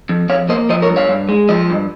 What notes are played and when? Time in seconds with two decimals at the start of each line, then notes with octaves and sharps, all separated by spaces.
0.09 F2
0.29 F2 C#5 F5
0.49 A#3 C5 D#5
0.69 F3 C5 D#5
0.82 A#4 C#5
0.89 G2
0.96 C#5 F5
1.09 G2
1.29 G#3
1.49 F3 C5 D#5
1.70 G2